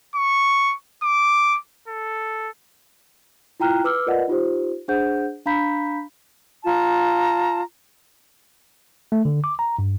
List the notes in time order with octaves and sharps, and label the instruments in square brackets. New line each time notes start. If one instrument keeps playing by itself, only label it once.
[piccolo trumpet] C#6
D6
A4
[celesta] E4 F4 G5 A#5 F6 F#6
B4 D6 E6 F6
F4 A#4 B4 D5 D#5 F#5
D#4 F4 G4 C5
D4 G#4 C5 F#5 G6
D4 F5 A#5 B5 G6 B6
[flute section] F4 A5 A#5
[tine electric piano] A3
D3
D6
A#5
G2